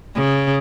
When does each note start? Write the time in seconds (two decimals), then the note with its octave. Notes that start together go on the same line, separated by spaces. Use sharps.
0.15 C#3